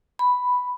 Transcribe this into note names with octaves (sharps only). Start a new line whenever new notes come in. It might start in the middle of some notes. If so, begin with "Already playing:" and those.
B5